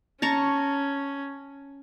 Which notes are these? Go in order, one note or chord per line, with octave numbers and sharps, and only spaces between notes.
C#4 A5 A#5 C#6